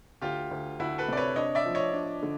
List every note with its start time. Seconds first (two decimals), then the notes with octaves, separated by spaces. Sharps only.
0.21 D2 F4 G4
0.51 D2
0.79 D2 E4 F#4
0.98 A4 B4
1.08 C3 D5
1.17 B4 C#5
1.36 D4 C#5 D#5
1.55 D5 E5
1.65 F3
1.75 C#5 D#5
1.94 D4
2.23 D3